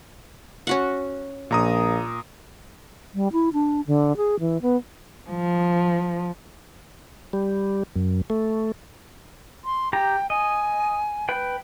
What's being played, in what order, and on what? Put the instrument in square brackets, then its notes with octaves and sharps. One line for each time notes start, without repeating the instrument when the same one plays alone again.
[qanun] C#4 F#4 F#5
[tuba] A#1 [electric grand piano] A#2 A#5 D#6
[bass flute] G3
E4
D4
D3
G#4
E3
B3
[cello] F3
[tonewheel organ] G3
F#2
A3
[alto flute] C6
[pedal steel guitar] G4 A#5 [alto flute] G5
[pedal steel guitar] D#5 [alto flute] G#5
[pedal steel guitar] B4 G5